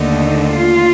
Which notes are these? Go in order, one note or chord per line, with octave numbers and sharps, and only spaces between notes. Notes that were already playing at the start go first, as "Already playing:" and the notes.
Already playing: D#2 D3 A3 D#4
F4